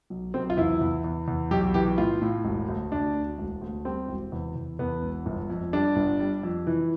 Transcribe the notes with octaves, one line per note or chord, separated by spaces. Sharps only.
B1
B1 C4
F4
E2 E4
E2
E2
E2
B1 G4
E3 G4
A2 F4
A2
E1
D2
D2 D4
D2
E1
D2
G3 C4
E1
E2
E2
E2 B3
E1
G1
F2
G3 D4
G1
G3
F2
E3